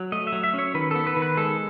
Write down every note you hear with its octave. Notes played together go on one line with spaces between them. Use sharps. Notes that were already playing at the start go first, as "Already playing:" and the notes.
Already playing: F#3
A3 D#5
E5
F#3
E5
C#4 C#5
D#3 B4
B3 A4
B4
D#3
B4
G#3 A4